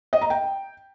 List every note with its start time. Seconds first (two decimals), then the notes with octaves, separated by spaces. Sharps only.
0.13 D#5
0.21 A#5
0.30 G5